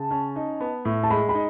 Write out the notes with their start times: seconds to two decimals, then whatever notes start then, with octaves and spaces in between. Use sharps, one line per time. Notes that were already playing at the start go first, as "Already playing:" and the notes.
Already playing: C#3 A5
0.11 C#4
0.36 D#4
0.60 B3
0.85 A2
1.03 A5
1.10 G#3 B5
1.29 B5
1.35 D#4